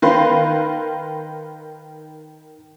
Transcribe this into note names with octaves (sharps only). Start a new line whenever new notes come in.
D#3 A#4 B4 F5 C6 C7